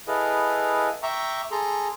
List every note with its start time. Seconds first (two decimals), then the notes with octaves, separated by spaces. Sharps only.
0.07 E4 G#4 A4 B4 D#5 F5
1.03 E5 G5 A#5 C#6 D6
1.51 G#4 A4 A#5 C6